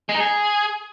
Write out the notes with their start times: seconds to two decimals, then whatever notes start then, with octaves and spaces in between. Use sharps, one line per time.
0.09 G#3
0.15 D#4
0.20 G#4